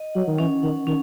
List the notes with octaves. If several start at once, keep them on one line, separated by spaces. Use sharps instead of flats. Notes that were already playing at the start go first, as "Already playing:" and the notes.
Already playing: D#5
F#3 F#5
D#3
E3 C#4
D#3 F#5
D#3 C#4